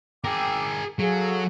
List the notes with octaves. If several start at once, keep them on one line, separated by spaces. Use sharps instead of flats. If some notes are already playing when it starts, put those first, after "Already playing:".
G#4 A#4 G5 D6 E6
F#3 G#4 A4 F5